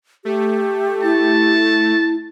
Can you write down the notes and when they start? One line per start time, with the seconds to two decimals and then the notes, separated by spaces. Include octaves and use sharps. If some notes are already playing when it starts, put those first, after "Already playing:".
0.25 A3 G4
1.03 E4 A5